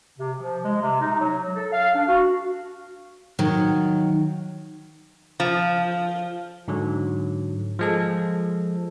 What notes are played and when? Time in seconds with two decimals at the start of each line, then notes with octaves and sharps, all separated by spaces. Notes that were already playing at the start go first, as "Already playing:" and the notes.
0.18 C3
0.39 F3
0.65 G#3
0.81 C3
1.01 D#4
1.20 F#3
1.55 A4
1.72 F5
1.95 D4
2.08 F#4
3.39 D#3 F#3
5.40 F3
6.68 G#2 D3 F#3
7.79 F3 G#3 A4